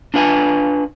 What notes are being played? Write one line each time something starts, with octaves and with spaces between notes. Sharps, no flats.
D4 F4 B4 G#5